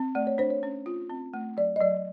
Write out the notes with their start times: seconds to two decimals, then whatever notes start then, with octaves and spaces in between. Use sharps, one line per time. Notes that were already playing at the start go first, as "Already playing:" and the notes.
Already playing: C4
0.15 A3 D5
0.27 C#5
0.38 D4 C5
0.51 C#5
0.63 C#4
0.86 F4
1.10 C4
1.34 A3
1.57 F#3 D5
1.76 D#5
1.80 F#3 D5